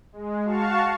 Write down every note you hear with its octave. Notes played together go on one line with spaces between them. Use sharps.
G#3
F#4 F5 A5 C#6